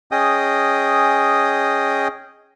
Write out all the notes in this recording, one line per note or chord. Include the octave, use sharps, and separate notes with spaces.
C#4 G#4 D#5 G5 D#6